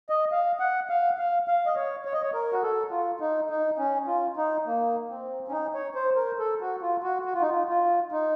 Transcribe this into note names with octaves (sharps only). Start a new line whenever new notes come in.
D#5
F5
F#5
F5
F5
F5
D#5
C#5
C#5
D#5
C#5
A#4
F#4
A4
F4
D#4
D#4
C#4
F4
D#4
A#3
C4
C#4
D#4
C#5
C5
A#4
A4
F#4
F4
F#4
F#4
F4
D#4
F4
F4
D#4